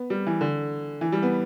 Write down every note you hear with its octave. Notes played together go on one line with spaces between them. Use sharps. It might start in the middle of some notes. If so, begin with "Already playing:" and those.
Already playing: B3
G3
E3
D3
E3
G3
B3